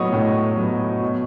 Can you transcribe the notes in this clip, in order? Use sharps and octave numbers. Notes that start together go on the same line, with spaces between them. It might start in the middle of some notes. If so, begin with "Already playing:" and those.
Already playing: A2 F#3 B3 C#5 D#5 C#6 D#6
A2
F#3 B3
B2